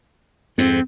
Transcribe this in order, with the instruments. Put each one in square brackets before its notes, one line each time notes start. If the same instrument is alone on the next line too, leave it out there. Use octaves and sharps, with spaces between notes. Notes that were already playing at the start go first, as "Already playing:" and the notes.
[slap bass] F2 G#2 [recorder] C4